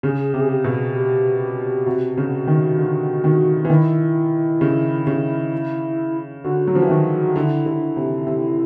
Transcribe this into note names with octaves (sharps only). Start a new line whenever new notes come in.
C#3 G#4
C3 G4
G#4
G4
B2 G#4
G4
G4
C3 F#4
C#3
D#3
D3
D#3
E3
D#3 E4
C#3
C#3
D3 F#4
F#3
F3
E3
D#3 F#4
D3 E4
D3
C3
C3